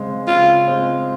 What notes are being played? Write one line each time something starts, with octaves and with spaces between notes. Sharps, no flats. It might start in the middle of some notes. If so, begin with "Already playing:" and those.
Already playing: C#3 G#3 C4
C#3 F4
G#3 C4